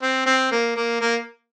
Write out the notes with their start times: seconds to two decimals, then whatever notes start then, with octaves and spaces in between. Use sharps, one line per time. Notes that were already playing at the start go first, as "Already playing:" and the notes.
0.02 C4
0.26 C4
0.51 A#3
0.76 A#3
1.00 A#3